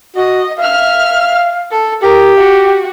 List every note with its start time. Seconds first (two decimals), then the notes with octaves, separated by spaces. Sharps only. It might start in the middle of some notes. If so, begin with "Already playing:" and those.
0.16 F#4 D#5
0.59 E5 F5 F6
1.71 A4
2.03 G4 A#4
2.37 F#4